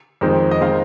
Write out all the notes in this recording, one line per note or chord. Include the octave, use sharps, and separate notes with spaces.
F2 D#3 G#3 C4 D#4
D#5
D#3 G#3 C4 F5